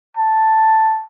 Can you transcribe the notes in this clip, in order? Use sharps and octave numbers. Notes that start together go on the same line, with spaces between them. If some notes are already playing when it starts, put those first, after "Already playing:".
A5